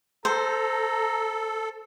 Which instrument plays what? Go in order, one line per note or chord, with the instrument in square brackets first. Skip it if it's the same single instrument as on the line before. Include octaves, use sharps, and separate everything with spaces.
[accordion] A4 [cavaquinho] C5 [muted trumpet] A#5